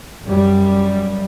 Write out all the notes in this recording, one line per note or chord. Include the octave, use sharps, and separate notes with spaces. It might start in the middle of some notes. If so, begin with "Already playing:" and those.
F#2 G3